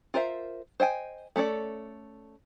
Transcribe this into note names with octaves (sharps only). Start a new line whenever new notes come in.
F4 A#4 C5 D5 E5
C5 D#5 G5 G#5
A3 C#4 A4 D5